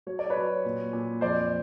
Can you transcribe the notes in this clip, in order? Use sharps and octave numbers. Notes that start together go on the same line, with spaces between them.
F#3 C#5
D5
B4 C#5
F#3
A#2
A#2
F2 C5 D5